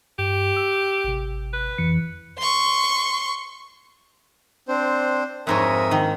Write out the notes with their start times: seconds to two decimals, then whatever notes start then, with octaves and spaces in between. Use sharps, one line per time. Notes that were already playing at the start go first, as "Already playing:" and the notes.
0.19 G2 G4
0.57 E6
1.04 G#1 C3
1.53 B4
1.78 F2 E3 C#7
2.38 C6 C#6
4.68 C4 D4 C5
5.47 F2 G#2 A#4 C#5 E5 D#6
5.91 D#3